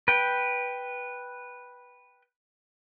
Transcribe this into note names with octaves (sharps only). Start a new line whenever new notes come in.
B4 G5